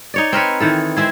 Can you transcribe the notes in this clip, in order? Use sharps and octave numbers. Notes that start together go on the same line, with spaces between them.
D#4 C#5 D5
C4 A#4 B4 C#5
D#3 E3 A4
G#3 C4 E4 G#4